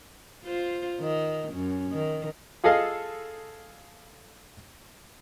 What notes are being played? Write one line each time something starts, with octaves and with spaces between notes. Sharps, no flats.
F4 C5
D#3 D#4
F#2 C#4
D#3
F4 G#4 A4 D#5 F5